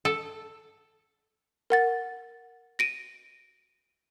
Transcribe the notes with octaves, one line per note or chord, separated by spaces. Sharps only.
A4
A#4 F#5 A6
A#6 D7 D#7